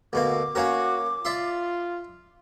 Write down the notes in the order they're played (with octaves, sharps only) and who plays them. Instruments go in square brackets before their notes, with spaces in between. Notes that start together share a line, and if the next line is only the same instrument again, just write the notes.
[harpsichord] D2 B2 A#3 [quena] D6
[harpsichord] A#3 C#4 A#4 [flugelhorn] F#4
[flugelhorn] F4 [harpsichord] D5 E5 C6